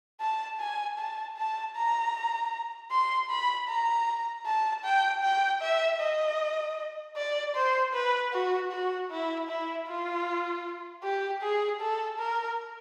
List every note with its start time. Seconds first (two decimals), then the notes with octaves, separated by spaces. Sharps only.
0.21 A5
0.60 G#5
0.98 A5
1.37 A5
1.76 A#5
2.91 C6
3.30 B5
3.69 A#5
4.46 A5
4.85 G5
5.24 G5
5.62 E5
6.00 D#5
7.17 D5
7.55 C5
7.94 B4
8.33 F#4
8.72 F#4
9.10 E4
9.49 E4
9.87 F4
11.03 G4
11.42 G#4
11.81 A4
12.19 A#4